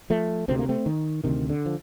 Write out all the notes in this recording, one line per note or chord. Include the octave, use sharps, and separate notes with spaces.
F3 A3
D2 C3 C4
A#3
A3 C4
D#3
D2 C3 D#3
D3
F3